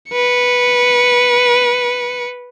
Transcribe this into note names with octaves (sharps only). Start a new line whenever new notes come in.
B4 C#7